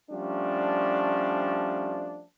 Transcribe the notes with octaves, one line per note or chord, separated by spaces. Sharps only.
F3 G3 A3 C#4 D4